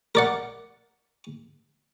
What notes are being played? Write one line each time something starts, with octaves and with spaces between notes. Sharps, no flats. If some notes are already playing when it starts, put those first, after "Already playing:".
A#4 D5 F#5